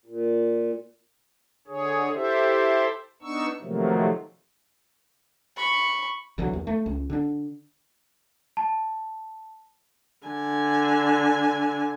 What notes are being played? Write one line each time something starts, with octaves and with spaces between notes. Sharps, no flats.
A#2
D3 G#4 C#5
E4 G4 A4 C5 E5
B3 D4 D#4 C#6 E6
C3 D#3 F3 F#3 A3 A#3
B5 C#6
B1 D3 E3 F#3
D#2
A3
C#2
D3 D4
A5
D3 G#5